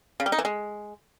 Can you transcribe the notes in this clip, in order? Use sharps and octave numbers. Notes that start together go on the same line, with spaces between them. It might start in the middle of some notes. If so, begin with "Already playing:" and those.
C#3
G3
D#4
E3
G#3